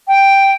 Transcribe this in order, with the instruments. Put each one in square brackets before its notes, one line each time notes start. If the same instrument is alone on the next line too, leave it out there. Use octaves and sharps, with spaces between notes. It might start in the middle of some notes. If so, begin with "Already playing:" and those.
[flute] G5